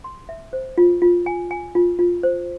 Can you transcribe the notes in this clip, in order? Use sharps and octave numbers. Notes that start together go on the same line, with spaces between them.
C6
E5
C5
F4
F4
G#5
G#5
F4
F4
C5